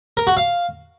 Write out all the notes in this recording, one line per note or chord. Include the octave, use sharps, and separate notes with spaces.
A#4
F#4
F5